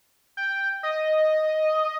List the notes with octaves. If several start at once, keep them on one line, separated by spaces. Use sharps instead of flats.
G5
D#5